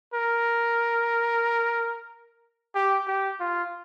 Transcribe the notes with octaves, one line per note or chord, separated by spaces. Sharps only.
A#4
G4
G4
F4